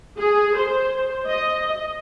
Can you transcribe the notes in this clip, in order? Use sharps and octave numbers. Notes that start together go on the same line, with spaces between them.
G#4
C5
D#5